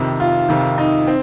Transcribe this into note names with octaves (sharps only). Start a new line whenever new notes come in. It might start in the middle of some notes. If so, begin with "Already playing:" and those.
Already playing: F2 C3 D#3
F4
F2 C3 D#3
D#4
C4